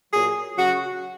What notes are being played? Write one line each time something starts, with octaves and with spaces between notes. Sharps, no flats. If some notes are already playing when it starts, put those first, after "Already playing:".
A#2 F#3 G#4
C#3 F#3 F#4